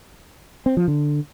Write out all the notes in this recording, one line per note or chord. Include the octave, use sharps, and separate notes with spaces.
C4
F3
D3